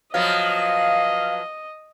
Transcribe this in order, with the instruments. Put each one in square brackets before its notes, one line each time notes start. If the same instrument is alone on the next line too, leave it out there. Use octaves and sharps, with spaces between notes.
[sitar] F3 F#3 B3 [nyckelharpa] D#5 [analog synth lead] F5